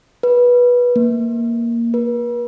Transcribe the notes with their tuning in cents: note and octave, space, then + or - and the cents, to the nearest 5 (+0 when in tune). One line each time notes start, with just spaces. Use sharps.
B4 -15
A#3 +0
B4 -45